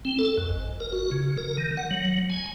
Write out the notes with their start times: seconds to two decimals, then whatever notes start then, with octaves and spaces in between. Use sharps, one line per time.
0.05 C4
0.19 A4
0.38 F#2
0.49 G#1
0.80 A#4
0.93 F#4
1.11 C#3
1.38 A#4
1.57 D#3
1.77 F#5
1.91 F#3
2.30 G#5